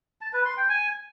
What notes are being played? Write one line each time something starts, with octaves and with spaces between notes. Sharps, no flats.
A5
B4
C6
G5
G#5